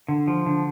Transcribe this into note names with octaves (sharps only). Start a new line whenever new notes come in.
D3
F3
D3